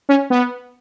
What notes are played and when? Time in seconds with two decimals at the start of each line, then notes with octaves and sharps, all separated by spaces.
0.09 C#4
0.30 B3